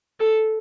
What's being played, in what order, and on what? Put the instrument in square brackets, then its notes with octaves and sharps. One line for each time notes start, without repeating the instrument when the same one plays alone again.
[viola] A4